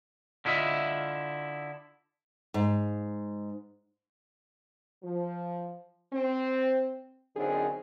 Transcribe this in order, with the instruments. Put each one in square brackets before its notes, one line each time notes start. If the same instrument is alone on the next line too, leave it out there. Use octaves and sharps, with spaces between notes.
[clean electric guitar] D3 E4 F4 D#5 E5
[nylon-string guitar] G#2
[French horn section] F3
C4
F#2 D3 D#3 C4 D#4 G#4